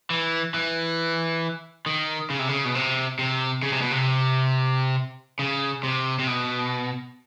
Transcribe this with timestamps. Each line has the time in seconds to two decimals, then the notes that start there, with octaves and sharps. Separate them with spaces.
0.10 E3
0.54 E3
1.86 D#3
2.30 C#3
2.39 C3
2.49 C#3
2.65 B2
2.75 C3
3.19 C3
3.63 C#3
3.73 C3
3.82 B2
3.91 C3
5.39 C#3
5.83 C3
6.19 C3
6.27 B2